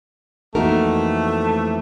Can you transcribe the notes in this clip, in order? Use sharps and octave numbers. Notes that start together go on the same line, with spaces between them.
F2 E3 A3 A#3 D#4 F#4 A#4